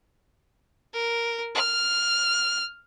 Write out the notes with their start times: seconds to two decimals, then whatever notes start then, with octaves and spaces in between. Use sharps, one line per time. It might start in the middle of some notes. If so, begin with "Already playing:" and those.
0.94 A#4
1.55 F6